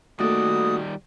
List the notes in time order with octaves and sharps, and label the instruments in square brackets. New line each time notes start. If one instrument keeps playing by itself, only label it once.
[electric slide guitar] D#3 G3 D5 [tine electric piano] A3 A#3 A4 [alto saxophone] F#4 [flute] D#6